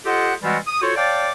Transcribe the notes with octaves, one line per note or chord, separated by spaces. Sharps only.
F4 G4 A4 C5 D#5 F#5
E3 G3 G#3 C4 F4 F#4
D#6
F4 F#4 A4 C5 C#5
C#5 D5 F5 G5 A5 D6